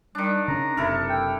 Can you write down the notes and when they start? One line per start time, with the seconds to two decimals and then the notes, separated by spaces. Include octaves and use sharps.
0.15 D#3 G3 D4
0.48 C#3 C#4 A#5
0.77 F#1 C3 E4 A4 A#4
1.10 G5